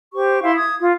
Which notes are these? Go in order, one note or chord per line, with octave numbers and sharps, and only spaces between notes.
G4 C5 C#6
E4 F5 C6
D#6 G#6
F4